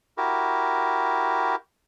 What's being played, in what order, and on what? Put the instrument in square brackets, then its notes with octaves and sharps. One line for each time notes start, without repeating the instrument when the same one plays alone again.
[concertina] E4 F#4 G4 A#4